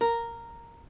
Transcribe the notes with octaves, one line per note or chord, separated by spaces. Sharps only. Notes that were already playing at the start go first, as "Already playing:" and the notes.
A#4